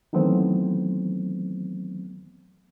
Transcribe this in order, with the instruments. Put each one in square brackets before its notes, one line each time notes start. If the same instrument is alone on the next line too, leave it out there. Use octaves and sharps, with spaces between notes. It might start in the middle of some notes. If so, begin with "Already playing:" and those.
[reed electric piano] D#3 E3 F#3 A3 B3 C4